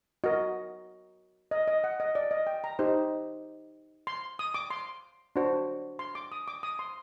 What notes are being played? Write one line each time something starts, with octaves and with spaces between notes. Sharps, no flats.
F#4 A#4 D#5
D#5
D#5
F#5
D#5
D5
D#5
G5
A#5
D#4 G4 C5
C6
D#6
D6
C6
D4 F#4 C5
C6
D6
D#6
D6
D#6
C6